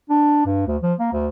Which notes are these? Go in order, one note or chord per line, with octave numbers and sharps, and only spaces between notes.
D4
G2
D2
F3
A#3
D2